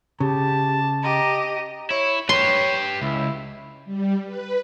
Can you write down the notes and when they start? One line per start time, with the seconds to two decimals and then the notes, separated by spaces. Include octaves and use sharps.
0.20 C#3 G4 A5
1.03 G4 D#5 A#5
1.90 E4 C#5
2.29 G4 B4 C#5 C6
3.02 C#2 E4
3.85 G3
4.25 B4